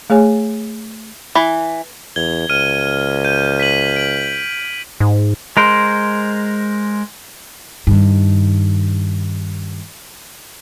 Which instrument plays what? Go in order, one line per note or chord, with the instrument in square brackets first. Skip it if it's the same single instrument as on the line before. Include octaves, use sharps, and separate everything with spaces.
[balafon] A3 G#4 C#5 G#5
[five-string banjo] E3
[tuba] E2 [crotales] G#6 G7
[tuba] C#2 [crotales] F6 D#7
[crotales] G6 D#7
B6 D#7 F#7
D7 F#7
[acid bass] G#2
[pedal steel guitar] G#3 A#4 C5
[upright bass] G2 D#3